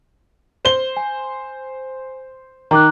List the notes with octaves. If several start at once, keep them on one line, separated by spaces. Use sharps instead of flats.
C5 G7
G#5
D#3 A#5 D6 F#6